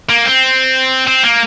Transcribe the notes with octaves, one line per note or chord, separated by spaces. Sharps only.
A#3
C4
C4
A#3